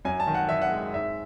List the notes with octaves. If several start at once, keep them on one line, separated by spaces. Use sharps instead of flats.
F#2 G#5
A5
D#3
F#5
D#3 E5
F#5
G#3
G#2 E5